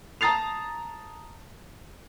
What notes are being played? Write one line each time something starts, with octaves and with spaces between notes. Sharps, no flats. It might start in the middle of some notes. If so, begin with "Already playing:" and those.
A5 A#5 D#6 A6 C7 F7